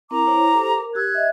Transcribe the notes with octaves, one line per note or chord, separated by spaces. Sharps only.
C4 E4 A#4 A#5 D6
E4 C5 C#5
G4 A4 C5
A#4
G4 E6 F#6 G#6
D#5 E5